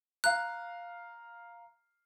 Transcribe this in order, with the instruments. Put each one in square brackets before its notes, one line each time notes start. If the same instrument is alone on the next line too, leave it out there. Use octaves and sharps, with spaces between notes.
[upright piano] F5 A#5 [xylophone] F#6